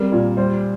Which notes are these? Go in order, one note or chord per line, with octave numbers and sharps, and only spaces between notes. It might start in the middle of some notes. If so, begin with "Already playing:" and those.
Already playing: G3 C4 A#4
A#2
G3 C5